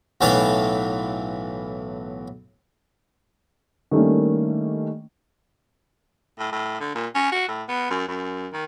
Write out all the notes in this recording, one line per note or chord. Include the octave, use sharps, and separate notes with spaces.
B1 A2 E3 A3 F5 A5
D#3 G3 A3 A#3 C#4 D4
A2
A2
D3
A#2
C#4
F#4
A2
B3
F#2
F#2
D#3